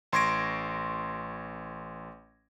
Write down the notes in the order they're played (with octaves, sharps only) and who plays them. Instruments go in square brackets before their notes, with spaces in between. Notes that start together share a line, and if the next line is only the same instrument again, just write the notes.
[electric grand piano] A1 C6 C#6 G#6 A#6 D7